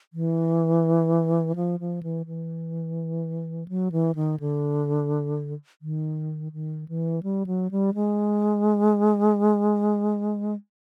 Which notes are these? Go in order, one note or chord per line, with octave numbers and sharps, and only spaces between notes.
E3
F3
F3
E3
E3
F#3
E3
D#3
D3
D#3
D#3
E3
G3
F#3
G3
G#3